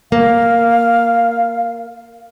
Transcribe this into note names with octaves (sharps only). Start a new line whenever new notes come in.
A#3 F5